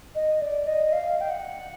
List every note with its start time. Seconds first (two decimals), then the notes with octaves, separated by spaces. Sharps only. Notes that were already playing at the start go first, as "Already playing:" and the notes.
0.15 D#5
0.41 D5
0.67 D#5
0.93 F5
1.21 G5
1.30 F#5